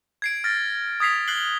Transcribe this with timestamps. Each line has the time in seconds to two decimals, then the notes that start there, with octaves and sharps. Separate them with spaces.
0.22 G#6 C7 D7
0.44 F6 A6 A#6
1.00 D#6 G#6 B6 C7 F7
1.28 F#6 C7 F#7 G7